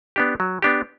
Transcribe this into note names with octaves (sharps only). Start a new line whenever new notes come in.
B3 D4 G4
F#3
B3 D4 G4